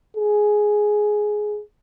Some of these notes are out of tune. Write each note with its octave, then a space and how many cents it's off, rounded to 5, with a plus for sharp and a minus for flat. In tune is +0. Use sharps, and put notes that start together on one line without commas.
G#4 +10